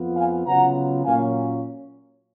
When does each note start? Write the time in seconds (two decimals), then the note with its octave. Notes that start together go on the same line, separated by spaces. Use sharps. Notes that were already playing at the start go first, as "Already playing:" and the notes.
Already playing: F2 F3 B3 F4
0.16 F5 G#5
0.46 C#3 F#3 B3 F4 F#5 A#5
1.05 A#2 F#3 A#3 C#4 F4 F5 G#5